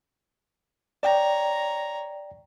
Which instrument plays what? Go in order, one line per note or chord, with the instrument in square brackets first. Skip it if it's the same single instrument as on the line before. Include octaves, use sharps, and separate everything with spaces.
[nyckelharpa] C#5 A#5 [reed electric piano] D5 G5